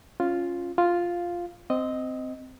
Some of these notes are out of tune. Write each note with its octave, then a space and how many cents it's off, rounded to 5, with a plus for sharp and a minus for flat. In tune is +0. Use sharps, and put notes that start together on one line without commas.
C#4 +0 F4 +0
F4 +0 F5 +0
C4 -15 D#5 +0